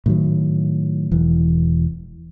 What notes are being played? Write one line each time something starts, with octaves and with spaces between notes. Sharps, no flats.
A2 D#3 F#3
E1 E3